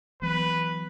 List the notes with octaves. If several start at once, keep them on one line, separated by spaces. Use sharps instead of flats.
E3 F#3 B3 B4